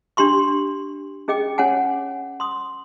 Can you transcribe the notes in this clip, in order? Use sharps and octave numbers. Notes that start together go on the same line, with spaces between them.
D4 G4 C6 C#6
C#4 G#4 D#5 G5 D6
C#4 C#5 F#5 G#5
C6 D#6